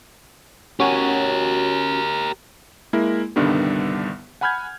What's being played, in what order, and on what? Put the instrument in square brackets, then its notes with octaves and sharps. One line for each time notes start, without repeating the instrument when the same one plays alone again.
[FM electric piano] C#4 F#4 G#5 [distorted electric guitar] G4 A#4
[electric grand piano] G#3 A#3 E4 A#4
C2 G2 D3 D#3 G3 B3
F#5 G#5 B5 F6 G6 G#6